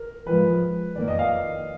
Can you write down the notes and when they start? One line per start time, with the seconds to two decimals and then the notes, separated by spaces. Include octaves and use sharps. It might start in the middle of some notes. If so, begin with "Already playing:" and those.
Already playing: A#4
0.26 G#2 F3 G#3 B4
0.96 F2 D#3 A#3 D5
1.08 D#5
1.19 F5